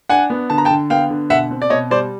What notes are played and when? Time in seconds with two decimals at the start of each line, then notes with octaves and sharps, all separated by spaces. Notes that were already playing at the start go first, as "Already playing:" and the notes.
0.09 D4 F#5 G#5
0.30 B3
0.50 D3 A5
0.58 A#5
0.65 G5 A5
0.70 D3
0.90 B3 F5 G5
1.10 D3
1.30 B2 E5 F#5
1.51 C4
1.62 D5
1.70 B2 C#5 D#5
1.91 G3 C5 D5